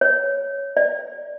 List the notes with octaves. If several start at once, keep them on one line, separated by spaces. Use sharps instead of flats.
C#5
D5